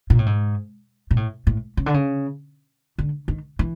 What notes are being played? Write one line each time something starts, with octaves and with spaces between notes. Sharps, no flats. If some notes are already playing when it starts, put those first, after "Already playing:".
A#2
A2
G#2
A#2
A2
A2
C#3
D3
C#3
D3
D#3
E3